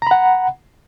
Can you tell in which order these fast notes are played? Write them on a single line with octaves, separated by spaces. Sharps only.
A#5 B5 F#5